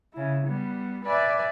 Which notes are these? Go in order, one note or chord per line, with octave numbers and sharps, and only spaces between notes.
C#3 E4
G3 B3
B4 D5 E5 G#5